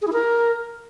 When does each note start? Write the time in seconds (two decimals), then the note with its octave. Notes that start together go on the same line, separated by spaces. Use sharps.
0.02 G#4
0.07 E4
0.13 A#4